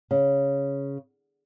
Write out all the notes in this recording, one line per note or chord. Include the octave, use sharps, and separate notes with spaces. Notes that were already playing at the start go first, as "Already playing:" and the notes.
C#3